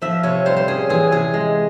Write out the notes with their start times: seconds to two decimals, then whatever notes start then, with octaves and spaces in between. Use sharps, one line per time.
0.02 F3 E5
0.23 C3 C#5
0.46 G3 C5
0.57 C5
0.68 C#4 G#4
0.89 E3 G#4
1.11 C3 G#4
1.34 G#3